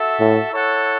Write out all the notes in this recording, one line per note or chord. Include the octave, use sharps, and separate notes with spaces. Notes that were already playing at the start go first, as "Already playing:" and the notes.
Already playing: F#4 A4 E5
A2
E4 A4 C#5 F#5